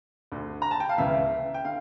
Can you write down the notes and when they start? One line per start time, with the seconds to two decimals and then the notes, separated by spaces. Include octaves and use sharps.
0.32 D2 D3
0.62 A#5
0.71 A5
0.80 G5
0.89 F5
0.98 C#2 C#3 E3 E5
1.54 G5
1.65 D3 F5